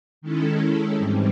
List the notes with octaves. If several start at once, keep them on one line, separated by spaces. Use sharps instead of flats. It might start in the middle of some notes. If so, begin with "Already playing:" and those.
D#3 G#3 C#4 E4 A4
G#2 E3 G3 C4